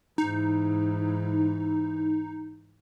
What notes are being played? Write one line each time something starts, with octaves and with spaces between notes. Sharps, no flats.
G#2 E3 D#4